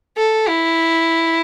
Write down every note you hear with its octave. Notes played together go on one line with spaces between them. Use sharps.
A4
E4